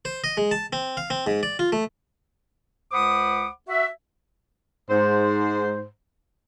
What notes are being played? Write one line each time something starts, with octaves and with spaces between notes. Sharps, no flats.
C5
D#5
G#3
A5
C4
F5
C4
G#2
D5
F4
A3
C#2 C5 F#5 B5 D6 D#6
F#4 E5
G#2 C5